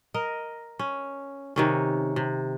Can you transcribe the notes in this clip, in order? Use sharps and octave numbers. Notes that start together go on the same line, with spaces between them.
A#4 D#5
C#4
C3 D#3 C#4
C3